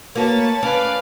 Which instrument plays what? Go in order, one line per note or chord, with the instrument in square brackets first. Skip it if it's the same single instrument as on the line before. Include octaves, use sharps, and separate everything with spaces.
[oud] A#3 F#4 [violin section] B4 C#5 A5
[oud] C#4 [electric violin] B4 F5 [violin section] D5